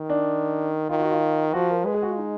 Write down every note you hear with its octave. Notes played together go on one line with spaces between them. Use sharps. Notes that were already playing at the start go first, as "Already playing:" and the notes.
Already playing: D#3
D4
D#3 F4
F#4
F4
F3 F#4
A#4
G#3 B4
G#4
F#4
F4
D#4